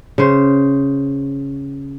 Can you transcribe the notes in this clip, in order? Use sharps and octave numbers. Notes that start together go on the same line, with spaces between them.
C#3 C5